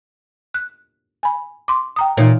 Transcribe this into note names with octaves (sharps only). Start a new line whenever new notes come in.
F#6
G#5 B5
C6 D6
G5 A#5 D#6
A#2 E3 D#4 C#5